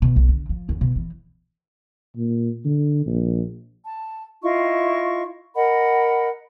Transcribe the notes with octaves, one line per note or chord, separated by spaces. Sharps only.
B2
B1
D3
F3
E2
B2
E3
A#2
D3
A#1
A5
E4 F4 D#5 C#6
A#4 D#5 F#5 B5